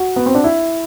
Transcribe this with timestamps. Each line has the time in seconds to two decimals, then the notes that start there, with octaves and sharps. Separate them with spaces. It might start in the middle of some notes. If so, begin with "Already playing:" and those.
Already playing: F#4
0.16 B3
0.26 C4
0.35 D4
0.44 E4